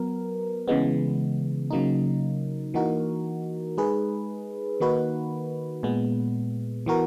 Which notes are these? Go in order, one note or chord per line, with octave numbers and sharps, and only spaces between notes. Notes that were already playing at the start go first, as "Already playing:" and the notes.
Already playing: F#3 B3 A#4
C#3 E3 G#3 B3
C#3 F#3 A#3 D#4
E3 A#3 D#4 F#4 A#4
G#3 D#4 G#4 B4
D#3 A#3 D#4 F#4 B4
A#2 G#3 B3
E3 B3 F#4 A#4